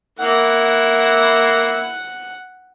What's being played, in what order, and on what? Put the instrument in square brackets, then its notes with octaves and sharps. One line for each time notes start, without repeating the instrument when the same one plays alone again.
[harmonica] A#3 E4 [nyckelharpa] F#5